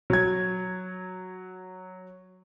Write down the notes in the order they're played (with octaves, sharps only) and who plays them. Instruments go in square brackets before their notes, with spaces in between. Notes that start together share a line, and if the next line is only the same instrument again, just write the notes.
[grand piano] F#3 G#6